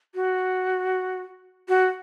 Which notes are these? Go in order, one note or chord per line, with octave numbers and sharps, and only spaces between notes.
F#4
F#4